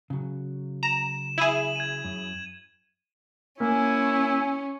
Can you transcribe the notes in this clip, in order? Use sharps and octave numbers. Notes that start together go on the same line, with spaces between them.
C#3 F#3
A#5 E7
E4 G#4 D#7 F#7
G#6 D#7
F#2
A#3 C#4 E4 G#5